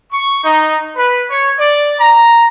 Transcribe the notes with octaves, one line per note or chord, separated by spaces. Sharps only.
C#6
D#4
B4
C#5
D5
A#5